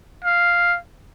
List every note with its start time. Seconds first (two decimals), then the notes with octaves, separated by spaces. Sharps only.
0.25 F5